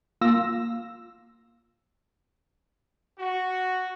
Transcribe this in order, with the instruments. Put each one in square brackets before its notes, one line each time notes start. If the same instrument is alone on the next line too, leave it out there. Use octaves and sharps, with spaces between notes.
[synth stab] A#3 F4 F5 E6 A#6
[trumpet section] F#4